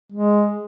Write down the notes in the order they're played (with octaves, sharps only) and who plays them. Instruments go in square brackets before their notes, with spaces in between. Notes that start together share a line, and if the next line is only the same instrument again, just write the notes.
[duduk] G#3